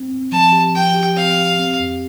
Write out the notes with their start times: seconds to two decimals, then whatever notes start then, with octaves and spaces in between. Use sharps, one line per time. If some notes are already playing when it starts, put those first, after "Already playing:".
Already playing: C4
0.11 C4
0.32 F3 A5
0.52 G4
0.74 F3 G5
0.95 G4
1.16 C4 F5
1.38 G4
1.59 C4
1.79 F2